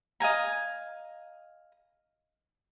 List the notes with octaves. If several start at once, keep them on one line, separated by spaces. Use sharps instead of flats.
D#5 F5 G#5 A#5